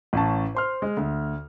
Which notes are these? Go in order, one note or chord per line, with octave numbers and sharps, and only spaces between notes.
A1 C#4 A5
C5 C6 F6
G#3
D2